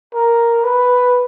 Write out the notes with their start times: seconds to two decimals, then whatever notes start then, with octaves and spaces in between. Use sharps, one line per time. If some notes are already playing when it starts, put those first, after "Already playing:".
0.14 A#4
0.64 B4